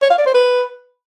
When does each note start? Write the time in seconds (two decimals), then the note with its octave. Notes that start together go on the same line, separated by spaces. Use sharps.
0.02 C#5
0.10 F5
0.18 D5
0.26 C5
0.34 B4